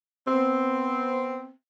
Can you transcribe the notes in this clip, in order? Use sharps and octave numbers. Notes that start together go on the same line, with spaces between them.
B3 C4